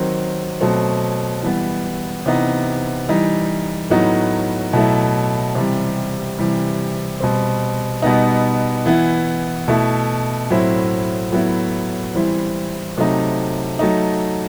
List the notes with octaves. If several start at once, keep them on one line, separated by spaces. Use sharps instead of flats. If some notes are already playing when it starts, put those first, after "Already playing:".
Already playing: D#3 F#3 C4
B2 F#3 A3 C4
E3 G3 B3
C3 E3 B3 D#4
E3 G3 D#4
A2 F#3 B3 D#4
B2 F#3 A3 E4
C3 E3 G3
C3 E3 G3
B2 G3 C4
B2 G3 B3 D#4
E3 B3 E4
B2 A3 E4
A2 F#3 C4 E4
A2 F#3 B3 E4
E3 G3 C4 E4
C3 F#3 A3 D#4
F#3 A3 D#4